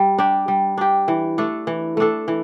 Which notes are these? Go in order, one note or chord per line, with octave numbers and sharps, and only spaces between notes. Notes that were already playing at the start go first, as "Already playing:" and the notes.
Already playing: G3
D4 G4
G3
D4 G4
E3
A3 D4 A4
E3
A3 D4 A4
E3